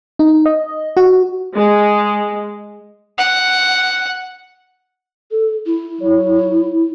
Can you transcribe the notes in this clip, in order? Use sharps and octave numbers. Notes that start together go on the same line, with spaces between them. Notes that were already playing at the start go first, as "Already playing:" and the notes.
D#4
D#5
F#4
G#3
F#5
A4
E4
F#3 C#5